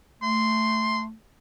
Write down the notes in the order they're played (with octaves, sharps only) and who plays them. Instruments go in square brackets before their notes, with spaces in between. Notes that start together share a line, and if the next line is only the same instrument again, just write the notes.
[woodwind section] A3 [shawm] C6